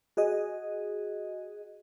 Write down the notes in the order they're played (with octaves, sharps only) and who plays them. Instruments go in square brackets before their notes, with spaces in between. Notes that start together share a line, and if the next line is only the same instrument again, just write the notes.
[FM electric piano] F#4 G#4 D#5